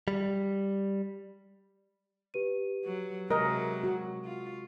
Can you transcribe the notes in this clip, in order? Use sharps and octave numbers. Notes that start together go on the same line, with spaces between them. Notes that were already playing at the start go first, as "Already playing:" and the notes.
G3
G4 B4 D#7
F#3
C3 F#3 G#3 A#4 D#5
F#4
F4